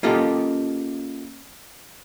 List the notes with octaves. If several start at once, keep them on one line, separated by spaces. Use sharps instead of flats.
A#3 C#4 F4 G4 A4 D#5